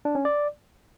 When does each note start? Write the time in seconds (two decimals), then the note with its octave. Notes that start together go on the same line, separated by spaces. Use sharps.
0.05 D4
0.15 C#4
0.25 D5